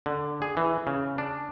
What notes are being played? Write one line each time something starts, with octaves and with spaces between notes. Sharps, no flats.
D3
G#4
E3
C#3
D4